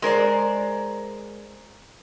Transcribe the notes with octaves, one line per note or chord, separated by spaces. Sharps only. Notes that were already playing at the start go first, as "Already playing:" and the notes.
G#3 A#4 C5 D5